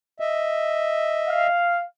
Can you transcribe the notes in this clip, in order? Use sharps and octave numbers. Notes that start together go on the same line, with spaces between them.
D#5 E5
F5